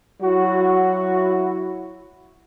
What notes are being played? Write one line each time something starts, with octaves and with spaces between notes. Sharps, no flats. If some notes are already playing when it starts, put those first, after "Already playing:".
F#3 E4 F#4